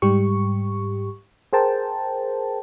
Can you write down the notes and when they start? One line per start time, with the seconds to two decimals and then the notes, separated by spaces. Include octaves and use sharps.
0.02 G#2 G3 G4 C#6
1.53 G#4 A#4 C5 G5 A5